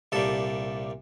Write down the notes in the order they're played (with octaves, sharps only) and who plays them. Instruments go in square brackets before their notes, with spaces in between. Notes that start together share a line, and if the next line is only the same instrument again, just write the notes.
[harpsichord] C2 A#2 G3 A4